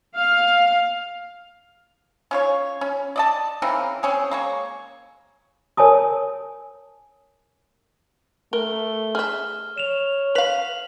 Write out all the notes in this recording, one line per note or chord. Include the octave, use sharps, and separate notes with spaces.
F5
C#4 F4 C#5
C#4
D5 D#5 A5
C#3 E3 C4 A#4
C4 C#4 G#4
G#3 A#3 C#5
A#4 C#5 G#5 A5 D#6
A3 A#4 G7
G#4 E5 F6
C#5 E7 F7
B4 F5 B6 F7 F#7